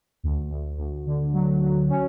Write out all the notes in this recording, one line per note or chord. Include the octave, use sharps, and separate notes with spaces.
D2
D2
D2
D3
F#3
F#3
C#4